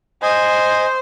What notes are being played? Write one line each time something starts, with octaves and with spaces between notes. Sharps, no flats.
C5 D#5 G#5